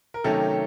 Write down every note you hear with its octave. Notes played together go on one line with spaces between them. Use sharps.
A#4
C3 D#3 F#3 A3 C#4 G4 A4